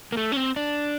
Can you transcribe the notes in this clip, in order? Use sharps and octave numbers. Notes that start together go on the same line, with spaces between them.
A#3
A3
C#4
C4
D4